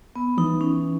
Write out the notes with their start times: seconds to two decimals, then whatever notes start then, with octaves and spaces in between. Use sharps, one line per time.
0.16 B3
0.38 E3 D#4
0.61 C#4